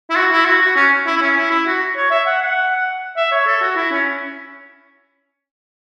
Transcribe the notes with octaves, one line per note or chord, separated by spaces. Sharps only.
E4
F#4
E4
F#4
F#4
C#4
E4
E4
C#4
E4
E4
F#4
C#5
E5
F#5
F#5
E5
C#5
A4
F#4
E4
C#4